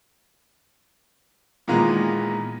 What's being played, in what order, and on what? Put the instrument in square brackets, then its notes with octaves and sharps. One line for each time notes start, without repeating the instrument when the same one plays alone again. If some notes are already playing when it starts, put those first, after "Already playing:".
[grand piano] A#2 D#3 E3 G#3 A#3 B3